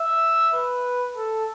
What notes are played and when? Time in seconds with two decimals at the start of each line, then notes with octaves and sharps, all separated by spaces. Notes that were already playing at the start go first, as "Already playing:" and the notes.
Already playing: E5
0.54 B4
1.16 A4